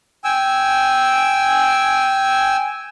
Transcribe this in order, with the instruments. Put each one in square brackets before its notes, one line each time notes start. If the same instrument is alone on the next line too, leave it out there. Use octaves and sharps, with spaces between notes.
[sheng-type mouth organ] G5 G#5 E6